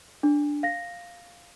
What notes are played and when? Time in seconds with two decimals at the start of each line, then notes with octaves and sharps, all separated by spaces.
0.23 D4
0.63 F5 A#6